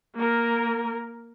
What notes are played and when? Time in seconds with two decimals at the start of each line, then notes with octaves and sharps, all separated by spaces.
0.15 A#3 A#4